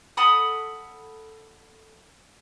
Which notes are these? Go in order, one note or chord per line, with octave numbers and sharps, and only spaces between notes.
A4 F#5 B5 D#6